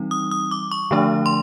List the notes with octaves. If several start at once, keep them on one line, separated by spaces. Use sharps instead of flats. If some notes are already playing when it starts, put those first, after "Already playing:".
Already playing: E3 G3 C4 D#4
D#6
D#6
D6
C#6
D3 F3 A3 D4
C6